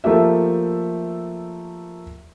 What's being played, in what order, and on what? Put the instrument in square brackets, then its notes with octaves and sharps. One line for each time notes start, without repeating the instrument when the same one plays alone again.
[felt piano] F3 A3 A#3 G4 E5